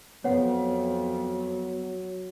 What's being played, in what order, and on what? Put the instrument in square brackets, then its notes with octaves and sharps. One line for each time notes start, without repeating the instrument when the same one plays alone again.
[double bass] F2 [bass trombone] F#3 [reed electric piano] B3 [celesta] C#5 F#5